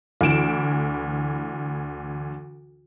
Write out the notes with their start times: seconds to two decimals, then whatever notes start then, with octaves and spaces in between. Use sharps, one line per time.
0.21 D2 E3 D7 E7